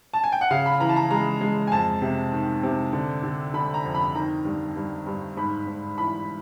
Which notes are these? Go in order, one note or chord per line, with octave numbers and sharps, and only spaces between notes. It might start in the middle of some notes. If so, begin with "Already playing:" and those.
A5
G#5
G5
F#5
C#3 F5
B5
E3 A#5
A5
A#5
G#3 A#5
G#3
G#5
F2 A5
C3
D#3
C3
D3
D3
D3 B5
A#5
F2
B5
D#3 A#5
G2
G2
G2
G#2 B5
G#2
E3 B5